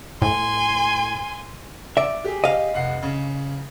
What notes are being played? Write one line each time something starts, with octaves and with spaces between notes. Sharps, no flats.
A2 G#5 C6
D5 E5
G4 G#4
D#5 F5
F1 F#5 C7
C#3